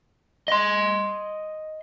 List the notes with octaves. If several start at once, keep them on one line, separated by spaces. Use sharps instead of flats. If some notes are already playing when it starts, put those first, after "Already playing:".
D#5 C6